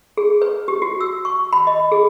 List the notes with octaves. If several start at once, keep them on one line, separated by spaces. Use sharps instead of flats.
G#4
B4
G4
F#4
E6
C#6
B5
D#5
G#4